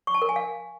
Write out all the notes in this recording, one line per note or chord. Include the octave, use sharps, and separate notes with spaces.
C#6
A5
A#4
G#5
F5